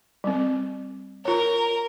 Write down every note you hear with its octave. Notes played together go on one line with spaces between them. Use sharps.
G3 C4
F4 A#4 C#5